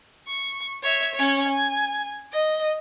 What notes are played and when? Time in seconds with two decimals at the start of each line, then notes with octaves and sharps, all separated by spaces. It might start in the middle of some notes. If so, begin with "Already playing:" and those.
0.27 C#6
0.83 C#5 E5
1.15 C#4 C#5
1.48 G#5
2.33 D#5